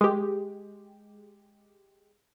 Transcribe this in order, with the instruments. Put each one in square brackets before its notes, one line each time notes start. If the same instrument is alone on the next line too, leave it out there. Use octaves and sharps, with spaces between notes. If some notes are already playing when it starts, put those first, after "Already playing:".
[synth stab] G#3 G4